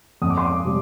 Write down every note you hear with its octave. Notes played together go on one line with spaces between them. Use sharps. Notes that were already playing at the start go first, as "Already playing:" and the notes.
F2 D#6
D6
C6
D6
C3 G3